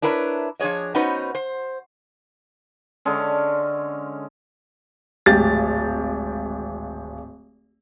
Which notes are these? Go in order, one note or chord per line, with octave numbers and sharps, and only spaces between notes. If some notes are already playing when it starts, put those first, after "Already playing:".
D4 E4 A#4 B4 C#5
F3 D4 G#4 C#5 D#5
B3 C#4 D#4 F#4 B4 C5
C5
D3 G#3 C#4
D1 G#1 G4 A6